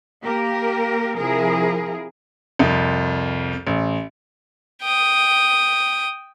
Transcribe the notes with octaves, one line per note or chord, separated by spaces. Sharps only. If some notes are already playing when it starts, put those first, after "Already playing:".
A#3 G4 A#4
C3 F3 E4 G#4 A#4
C2 F2
A1
G5 D#6